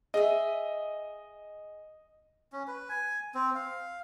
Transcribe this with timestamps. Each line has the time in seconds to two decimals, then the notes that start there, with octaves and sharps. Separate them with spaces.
0.14 G#4 D#5 E5
2.52 C#4
2.68 B4
2.89 G#5
3.34 C4
3.55 F5